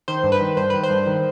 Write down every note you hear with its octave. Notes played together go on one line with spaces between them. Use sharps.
D#3 C5
G2
B4
D#3
G2 C5
D#3 B4
C5
G2
D#3